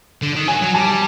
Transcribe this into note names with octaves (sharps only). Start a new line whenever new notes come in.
D3
D#3
F#3 G#5
F#3
G3 A5